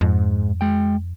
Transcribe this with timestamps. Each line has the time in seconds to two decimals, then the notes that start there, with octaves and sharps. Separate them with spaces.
0.01 F2 G#2
0.61 G#3 G5